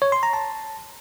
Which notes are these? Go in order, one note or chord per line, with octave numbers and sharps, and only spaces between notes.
C#5
C6
A#5
A5